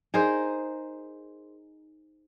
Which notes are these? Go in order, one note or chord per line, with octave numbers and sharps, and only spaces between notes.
D#4 G#4 A#4 C5